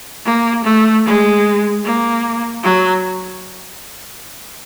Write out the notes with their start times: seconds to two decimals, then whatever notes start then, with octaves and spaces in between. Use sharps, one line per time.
0.25 A#3
0.64 A3
1.05 G#3
1.84 A#3
2.63 F#3